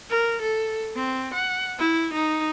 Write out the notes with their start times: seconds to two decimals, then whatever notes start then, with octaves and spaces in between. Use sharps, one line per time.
0.10 A#4
0.42 A4
0.96 C4
1.34 F#5
1.79 E4
2.14 D#4